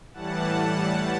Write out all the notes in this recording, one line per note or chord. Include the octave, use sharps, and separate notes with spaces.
A2 E3 G3 F#5 A5